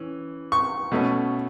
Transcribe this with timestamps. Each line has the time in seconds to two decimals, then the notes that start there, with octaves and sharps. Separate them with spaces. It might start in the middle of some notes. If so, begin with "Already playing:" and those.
Already playing: E3 C#4
0.52 C#6
0.92 B2 A3 C#4